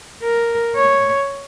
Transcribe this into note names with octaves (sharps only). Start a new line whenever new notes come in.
A#4
C#5